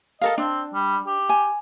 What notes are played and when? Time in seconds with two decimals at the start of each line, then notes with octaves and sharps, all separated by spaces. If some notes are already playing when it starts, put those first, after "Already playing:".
0.22 A4 A#4 D#5 F5
0.38 C4 D4
0.74 G3
1.07 G4
1.29 G#5